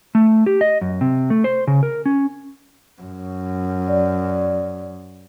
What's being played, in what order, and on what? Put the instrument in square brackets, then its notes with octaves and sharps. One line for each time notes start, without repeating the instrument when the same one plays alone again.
[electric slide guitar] A3
G4
D#5
F#2
C3
A3
C5
C#3
A#4
C#4
[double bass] F#2
[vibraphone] D5